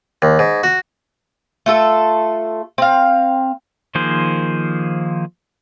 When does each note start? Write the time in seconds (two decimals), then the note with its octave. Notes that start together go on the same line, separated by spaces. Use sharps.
0.22 D#2
0.39 G#2
0.63 F#4
1.66 A3 F4 A4
2.78 C4 F5
3.95 D#3 F3 A#3 G#4 C5